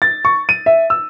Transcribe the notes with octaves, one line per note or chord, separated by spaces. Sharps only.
A6
C#6
D#7
E5
E6